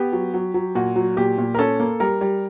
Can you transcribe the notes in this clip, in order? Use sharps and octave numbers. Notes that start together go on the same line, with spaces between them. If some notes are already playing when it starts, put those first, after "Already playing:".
Already playing: B3 G4
F#3
F#3
F#3
A#2 F#4
F#3
A#2 G4
A#2
A#4
C#4 A4
A#3
G3 A#4
G3